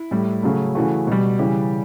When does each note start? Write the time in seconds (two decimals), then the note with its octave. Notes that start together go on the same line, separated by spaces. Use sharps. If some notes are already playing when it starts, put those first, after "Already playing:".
Already playing: E4
0.11 A2 G3
0.43 C#3 F#3 A3
0.75 C#3 E3 A3 F#4
1.07 B2 G3
1.39 C#3 E3 G3 G4